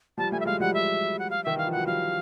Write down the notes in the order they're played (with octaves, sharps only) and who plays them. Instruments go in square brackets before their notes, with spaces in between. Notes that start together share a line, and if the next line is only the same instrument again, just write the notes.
[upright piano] F3 G3 [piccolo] A5
[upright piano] G3 A3 [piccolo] G#5
[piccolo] E5
[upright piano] F#3 G#3 [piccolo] F5
[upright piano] F3 G3 [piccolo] F#5
[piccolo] E5
F#5
F5
[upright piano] D#3 [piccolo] E5
[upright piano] E3 [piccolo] F5
[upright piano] F3
[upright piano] F#3 [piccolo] F#5
[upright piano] F3 G3 [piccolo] F5